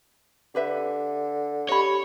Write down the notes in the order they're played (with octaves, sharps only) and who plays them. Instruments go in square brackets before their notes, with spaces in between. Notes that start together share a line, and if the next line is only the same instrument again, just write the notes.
[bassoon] D3 [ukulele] G4 B4 E5
[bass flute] G4 [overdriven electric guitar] C#5 [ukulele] D#5 B5